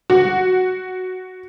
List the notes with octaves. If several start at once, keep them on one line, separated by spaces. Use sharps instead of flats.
F#4